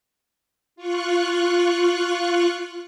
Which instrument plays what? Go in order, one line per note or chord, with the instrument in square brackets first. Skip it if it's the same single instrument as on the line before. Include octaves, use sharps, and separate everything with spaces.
[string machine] F4 C#6 F#6